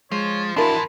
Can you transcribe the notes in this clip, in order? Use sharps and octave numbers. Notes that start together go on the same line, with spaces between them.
F3 G#3 C#5
F2 E3 D4 E4 F#4 A#4 A5 C6